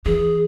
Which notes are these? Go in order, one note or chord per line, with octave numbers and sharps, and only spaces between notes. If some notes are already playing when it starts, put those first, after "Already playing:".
E3 G#4